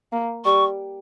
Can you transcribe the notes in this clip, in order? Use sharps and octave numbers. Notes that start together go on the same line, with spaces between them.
A#3
G3 C#6